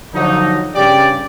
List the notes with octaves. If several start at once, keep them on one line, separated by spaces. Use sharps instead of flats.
D3 F3 F#3 D#4
G2 C#3 G4 D5